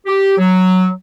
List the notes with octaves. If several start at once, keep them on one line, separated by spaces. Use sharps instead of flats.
G4
F#3